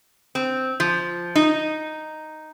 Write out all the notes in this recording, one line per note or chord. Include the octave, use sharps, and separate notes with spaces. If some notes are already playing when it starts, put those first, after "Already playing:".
C4
F3
D#4